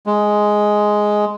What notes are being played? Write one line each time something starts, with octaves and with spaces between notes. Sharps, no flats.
G#3